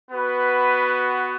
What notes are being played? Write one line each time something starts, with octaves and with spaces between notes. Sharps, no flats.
B3 F#4 B4